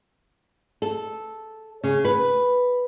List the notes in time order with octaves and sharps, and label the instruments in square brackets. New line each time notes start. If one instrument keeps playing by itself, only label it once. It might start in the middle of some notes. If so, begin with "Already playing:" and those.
[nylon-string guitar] A4
C#3
B4